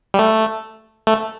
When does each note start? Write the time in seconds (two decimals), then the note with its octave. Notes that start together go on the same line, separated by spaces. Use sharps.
0.14 G3
0.19 A3
1.07 A3